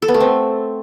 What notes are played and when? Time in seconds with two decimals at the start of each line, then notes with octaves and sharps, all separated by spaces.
0.02 A4
0.08 B3
0.14 A3
0.20 C4